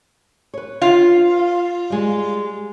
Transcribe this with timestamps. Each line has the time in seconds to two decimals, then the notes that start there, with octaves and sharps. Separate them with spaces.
0.54 B4 C#5
0.82 F4
1.90 G3 G#3